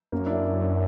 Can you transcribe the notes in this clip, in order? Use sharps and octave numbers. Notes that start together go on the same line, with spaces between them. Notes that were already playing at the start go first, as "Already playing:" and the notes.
F#2 A#3
D4 E4